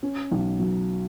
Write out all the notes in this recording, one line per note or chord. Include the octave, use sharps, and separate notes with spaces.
C#4
B1
F#3